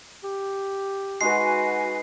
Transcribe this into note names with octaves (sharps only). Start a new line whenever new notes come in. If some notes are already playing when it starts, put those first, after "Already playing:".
G4
G#3 D#4 F#4 B4 G#5 C7